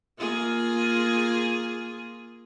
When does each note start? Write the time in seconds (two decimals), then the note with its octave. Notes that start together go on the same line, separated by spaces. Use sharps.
0.18 A#3 F4 G#4